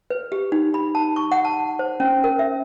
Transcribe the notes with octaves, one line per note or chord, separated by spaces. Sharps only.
B4
G4
D#4
B5
A5
C#6
F#5
A5
C5
C#4
A#4
E5